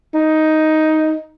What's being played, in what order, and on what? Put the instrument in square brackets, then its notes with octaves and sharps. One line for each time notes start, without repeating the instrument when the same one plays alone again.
[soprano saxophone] D#4